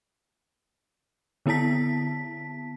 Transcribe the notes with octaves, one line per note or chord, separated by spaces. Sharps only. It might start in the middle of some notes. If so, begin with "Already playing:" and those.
D3 B3 E4 A5 B6